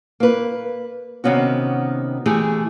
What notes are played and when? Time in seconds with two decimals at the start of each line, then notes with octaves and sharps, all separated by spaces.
0.20 A#3 B4
1.24 C3 D#3 B3 C#4 F#4
2.26 E3 A3 G4 G#4